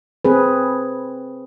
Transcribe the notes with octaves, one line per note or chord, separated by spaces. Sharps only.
C4 G#4 B4